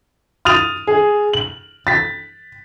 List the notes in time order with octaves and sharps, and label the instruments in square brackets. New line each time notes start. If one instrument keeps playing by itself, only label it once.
[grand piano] D#6 F6 A6 D#7 F7
G#4
F#7
A6 B6